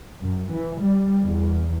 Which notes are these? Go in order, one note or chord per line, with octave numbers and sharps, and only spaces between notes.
F#2
E3
G3
E2